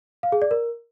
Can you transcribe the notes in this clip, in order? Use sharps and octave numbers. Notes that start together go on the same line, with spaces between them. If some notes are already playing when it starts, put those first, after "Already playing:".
F5
G#4
D5
A#4